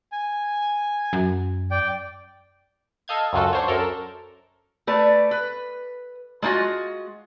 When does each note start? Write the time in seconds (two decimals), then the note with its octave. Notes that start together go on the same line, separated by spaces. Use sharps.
0.12 G#5
1.13 F#2
1.71 D5 G5
3.08 A4 D#5 F5 G6 G#6
3.33 C#2 F#2 F#3 F4 F#4 A4
3.53 D4 C5 C#5
3.68 F#2 A4 A#4
4.87 A3 B4 D5
5.31 B4
6.42 G#3 A#3 C#4 F4 F#4